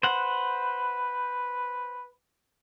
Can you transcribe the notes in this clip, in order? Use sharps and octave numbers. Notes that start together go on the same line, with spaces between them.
B4 C5 F#5